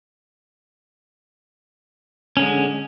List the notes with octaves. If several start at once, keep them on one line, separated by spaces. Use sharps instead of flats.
D3 G#3 C#4